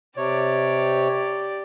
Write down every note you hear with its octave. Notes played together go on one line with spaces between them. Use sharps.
C3 G4 C#5 D5